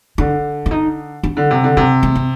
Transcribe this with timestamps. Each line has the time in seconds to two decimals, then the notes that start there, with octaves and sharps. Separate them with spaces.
0.18 D3 D4
0.66 D4
0.71 D#4
1.23 D4
1.37 D3
1.51 C3
1.64 D3
1.77 C3 D4
2.03 G#3
2.16 C4